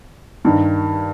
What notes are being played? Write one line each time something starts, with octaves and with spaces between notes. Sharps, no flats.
G2 D#3